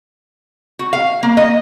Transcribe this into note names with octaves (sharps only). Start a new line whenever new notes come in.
F#4
F5
A#3
D#5